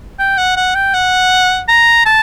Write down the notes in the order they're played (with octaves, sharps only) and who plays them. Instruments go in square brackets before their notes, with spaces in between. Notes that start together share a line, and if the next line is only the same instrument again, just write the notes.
[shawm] G5
F#5
F#5
G5
F#5
A#5
A5